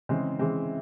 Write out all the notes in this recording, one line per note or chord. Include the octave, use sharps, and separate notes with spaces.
C#3 E3 G#3 C4
C#3 E3 G#3 C4